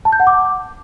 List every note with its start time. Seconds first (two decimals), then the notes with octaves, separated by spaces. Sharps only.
0.05 A5
0.12 G6
0.20 F#5
0.27 D6